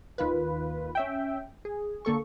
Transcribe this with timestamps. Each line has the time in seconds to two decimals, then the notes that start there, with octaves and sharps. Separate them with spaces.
0.18 D#2 D#3 F4 B4
0.95 C#4 E5 G5
1.65 G#4
2.05 D3 A#3 A4 C#6